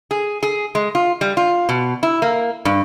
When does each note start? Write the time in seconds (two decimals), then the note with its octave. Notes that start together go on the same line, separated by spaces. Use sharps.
0.11 G#4
0.43 G#4
0.75 G#3
0.95 F4
1.21 G3
1.37 F4
1.69 B2
2.03 E4
2.22 A#3
2.65 G2